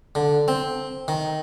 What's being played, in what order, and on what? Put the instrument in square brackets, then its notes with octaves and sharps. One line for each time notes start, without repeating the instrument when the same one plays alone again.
[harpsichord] D3
C4
D#3